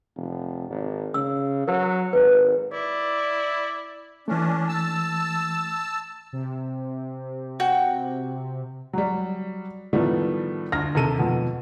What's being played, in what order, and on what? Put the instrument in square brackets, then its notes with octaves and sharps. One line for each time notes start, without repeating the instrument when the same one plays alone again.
[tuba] F1
G#1
[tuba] C#3 [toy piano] E6
[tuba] F#3 [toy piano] A#4
[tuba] G#1 [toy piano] B4
[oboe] E4 [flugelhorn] D5
[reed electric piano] E3 A3 [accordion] C#4 D4
[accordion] A5 E6
[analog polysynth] C3
[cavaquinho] F#4 G5
[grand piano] F#3 G3
A2 D#3 F3 G3 A3 B3
D2 F6 A#6
D#2 C3 A4 D#7
F2 B2